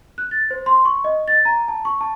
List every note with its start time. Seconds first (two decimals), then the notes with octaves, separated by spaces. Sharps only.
0.18 F#6
0.31 A6
0.50 C5
0.66 C6
0.85 C#6
1.04 D#5
1.28 A6
1.45 A#5
1.68 A5
1.85 C#6
2.01 A5